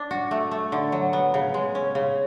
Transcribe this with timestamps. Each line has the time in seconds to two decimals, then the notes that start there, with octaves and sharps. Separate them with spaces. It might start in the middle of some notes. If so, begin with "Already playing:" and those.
Already playing: D4
0.11 F#4
0.31 A3
0.51 A3
0.72 D3
0.92 F#3
1.13 B3
1.34 C#3
1.54 G#3
1.75 C#4
1.95 C#3